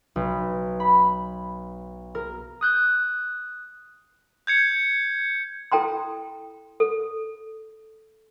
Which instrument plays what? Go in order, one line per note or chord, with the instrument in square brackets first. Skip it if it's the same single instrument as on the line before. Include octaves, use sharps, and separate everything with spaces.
[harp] B1
B5
A#4
[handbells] D#6 F#6 G6
[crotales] G6 G#6 C#7
[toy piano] E4 A4 G5 A#5 C6
A4